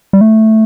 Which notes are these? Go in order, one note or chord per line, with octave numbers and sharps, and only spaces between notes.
G3
A3